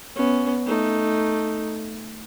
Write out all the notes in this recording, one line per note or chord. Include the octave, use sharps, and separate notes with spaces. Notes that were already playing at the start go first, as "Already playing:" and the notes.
B3 C#4
A3 D#4